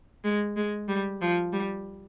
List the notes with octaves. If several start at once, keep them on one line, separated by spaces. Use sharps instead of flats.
G#3
G#3
G3
F3
G3